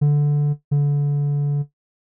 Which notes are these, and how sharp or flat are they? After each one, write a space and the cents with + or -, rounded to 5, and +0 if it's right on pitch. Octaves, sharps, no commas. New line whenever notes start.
D3 -5
D3 -30